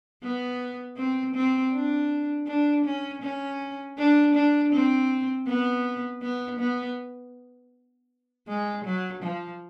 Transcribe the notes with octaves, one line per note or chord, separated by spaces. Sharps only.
B3
C4
C4
D4
D4
C#4
C#4
D4
D4
C4
B3
B3
B3
G#3
F#3
F3